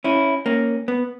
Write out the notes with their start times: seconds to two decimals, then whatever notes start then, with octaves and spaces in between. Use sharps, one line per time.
0.04 C#4 E4
0.46 A#3 C#4
0.88 B3